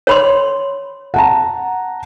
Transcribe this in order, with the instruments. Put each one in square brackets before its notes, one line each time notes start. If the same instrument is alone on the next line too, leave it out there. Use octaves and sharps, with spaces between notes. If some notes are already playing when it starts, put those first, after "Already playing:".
[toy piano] C#5 B5 C6
[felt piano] F#5 A5 A#5